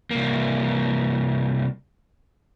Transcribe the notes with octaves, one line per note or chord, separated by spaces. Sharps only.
C2 A#3